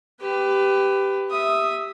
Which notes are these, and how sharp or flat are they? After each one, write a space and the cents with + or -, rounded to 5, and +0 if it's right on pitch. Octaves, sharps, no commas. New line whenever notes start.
G4 +0 B4 +20
E5 -5 D#6 +0